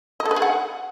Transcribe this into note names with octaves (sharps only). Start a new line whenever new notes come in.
D#5
A4
B4
G#4
F#5